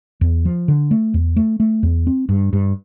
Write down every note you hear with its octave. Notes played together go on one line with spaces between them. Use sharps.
E2
F3
D3
A3
E2
A3
A3
E2
C4
G2
G2